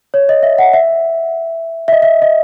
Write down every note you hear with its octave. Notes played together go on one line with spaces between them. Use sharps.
C#5
D#5
E5
F#5
E5
E5
D#5
E5
D#5